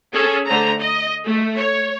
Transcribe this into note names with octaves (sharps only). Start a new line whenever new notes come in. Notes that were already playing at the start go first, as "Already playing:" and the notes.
C#4 G#4 A4
D3 A3 C5 A#5
D#5
A3
C#5